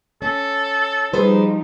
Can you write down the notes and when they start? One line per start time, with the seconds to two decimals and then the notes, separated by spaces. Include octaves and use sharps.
0.22 C#4 A4
1.13 F3 G3 D#4 G#4 B4 C5